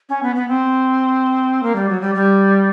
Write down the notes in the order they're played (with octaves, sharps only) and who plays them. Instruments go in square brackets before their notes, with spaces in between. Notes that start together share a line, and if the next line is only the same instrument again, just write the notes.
[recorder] C#4
B3
B3
C4
A#3
G3
F#3
G3
G3